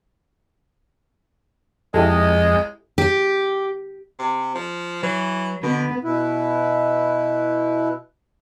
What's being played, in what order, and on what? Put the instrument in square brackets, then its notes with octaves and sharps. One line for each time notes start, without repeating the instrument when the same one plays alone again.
[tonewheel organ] F2 [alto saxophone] G#3 [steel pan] E4 G4 A4 [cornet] D#5
[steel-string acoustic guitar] G4
[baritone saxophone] C3
F3
[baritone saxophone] E3 [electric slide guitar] F#3
[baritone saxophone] B2 [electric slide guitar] D3 [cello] B3
[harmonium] B2 E4 B4